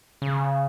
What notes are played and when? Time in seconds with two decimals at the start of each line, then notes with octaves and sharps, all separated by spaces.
0.22 C#3